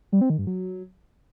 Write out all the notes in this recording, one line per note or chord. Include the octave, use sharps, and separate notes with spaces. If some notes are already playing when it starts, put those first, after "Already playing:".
G3
C4
D#3
G2
F#3